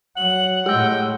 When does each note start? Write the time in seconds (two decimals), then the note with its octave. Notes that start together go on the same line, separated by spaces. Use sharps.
0.17 F#3 F#5 F#7
0.66 A2 G#3 G4 G5 E6